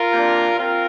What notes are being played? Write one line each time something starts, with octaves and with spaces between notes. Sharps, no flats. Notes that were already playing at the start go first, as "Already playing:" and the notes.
Already playing: F4 A#4
C3 A#3 D4
C4 F4 A#4